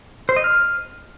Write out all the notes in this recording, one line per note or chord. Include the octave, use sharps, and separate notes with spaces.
C5
D#5
F6